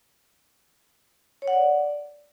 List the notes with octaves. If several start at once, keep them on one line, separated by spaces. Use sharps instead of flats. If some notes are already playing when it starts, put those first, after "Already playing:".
C#5
F#5
D5